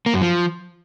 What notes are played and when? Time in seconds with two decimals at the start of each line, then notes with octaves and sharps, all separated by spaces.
0.06 A#3
0.14 F#2
0.21 F3